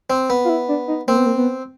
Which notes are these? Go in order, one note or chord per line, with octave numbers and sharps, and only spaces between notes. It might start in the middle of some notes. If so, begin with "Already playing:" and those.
C4
B3
F4
E4
D4
D#4
A#3 C4
B3
A#3
B3